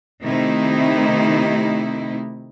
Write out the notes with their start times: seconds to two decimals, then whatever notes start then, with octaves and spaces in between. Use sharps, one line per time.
0.22 C3 D#3 A3 D#4 E4